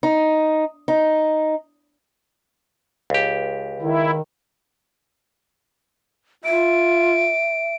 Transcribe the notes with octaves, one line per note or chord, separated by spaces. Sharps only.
D#4
D#4
C#2 G4
D#3 E4
F4 E5 D7